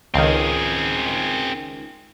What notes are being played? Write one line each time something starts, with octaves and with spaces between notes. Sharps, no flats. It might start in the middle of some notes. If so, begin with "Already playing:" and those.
C#2 D#3 C4 G#4